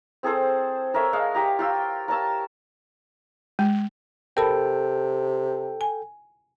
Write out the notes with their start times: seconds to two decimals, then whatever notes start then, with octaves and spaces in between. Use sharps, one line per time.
0.23 C4 G#4 A4 C5
0.94 A4 A#4 C#5 E5
1.13 G#3 F5
1.35 G4 A#5
1.59 F4 G5 E6
2.08 A#4 C#5 A5 E6
3.59 G#3
4.37 C3 A4 A#4 G5 A5 B5
5.81 G#5